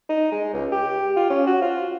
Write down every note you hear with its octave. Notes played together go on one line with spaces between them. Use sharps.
D#4
G#3
C#2
G4
F4
C#4
F#4
F4